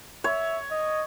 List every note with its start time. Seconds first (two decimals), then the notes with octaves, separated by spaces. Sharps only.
0.24 C#5 E5
0.71 D#5